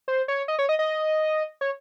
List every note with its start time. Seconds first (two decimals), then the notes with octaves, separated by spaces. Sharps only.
0.08 C5
0.28 C#5
0.48 D#5
0.59 C#5
0.69 D#5
0.79 D#5
1.61 C#5